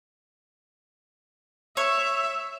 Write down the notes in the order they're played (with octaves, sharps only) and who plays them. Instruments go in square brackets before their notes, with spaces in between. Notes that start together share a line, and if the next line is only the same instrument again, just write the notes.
[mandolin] C#5 [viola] E5